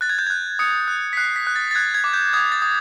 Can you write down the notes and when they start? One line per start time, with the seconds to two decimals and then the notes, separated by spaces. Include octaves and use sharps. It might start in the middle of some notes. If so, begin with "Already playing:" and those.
0.01 F#6 A6
0.09 G#6
0.19 G6
0.27 F#6 G#6
0.59 D#6 C#7
0.88 F#6
1.13 B6
1.17 F#6 C7
1.36 B6
1.47 F#6
1.56 A6
1.71 A6
1.75 F#6 G#6
1.94 G#6
2.04 D6
2.13 G6
2.33 D#6 G#6
2.52 A6
2.62 D#6